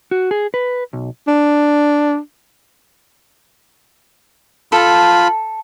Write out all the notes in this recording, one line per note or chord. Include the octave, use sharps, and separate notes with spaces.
F#4
G#4
B4
B1
D4
F4 A4 A5 B5